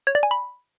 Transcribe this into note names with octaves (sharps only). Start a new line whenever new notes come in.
C#5
D5
G#5
B5